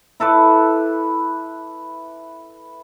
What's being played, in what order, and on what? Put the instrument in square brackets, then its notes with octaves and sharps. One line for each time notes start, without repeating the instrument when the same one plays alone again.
[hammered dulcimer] E4 A4 B4 D6